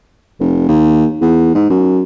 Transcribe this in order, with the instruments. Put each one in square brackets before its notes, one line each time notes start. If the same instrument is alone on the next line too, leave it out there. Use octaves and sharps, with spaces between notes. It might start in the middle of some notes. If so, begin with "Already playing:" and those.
[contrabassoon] F1
D#2
E2
G#2
F#2